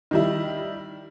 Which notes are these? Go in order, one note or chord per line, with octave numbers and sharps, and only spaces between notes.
D#3 G3 E4